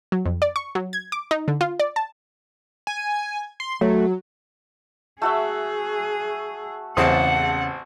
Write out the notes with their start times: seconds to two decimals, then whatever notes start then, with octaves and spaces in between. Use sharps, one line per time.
0.12 F#3
0.25 F2
0.42 D5
0.56 C#6
0.75 F#3
0.93 G#6
1.12 D6
1.31 D#4
1.48 D3
1.61 F4
1.80 D5
1.96 A5
2.87 G#5
3.60 C6
3.81 F#3 A3
5.22 A3 F#4 G#4 E5
6.97 A1 E2 C#3 C4 F#5 A5 D#6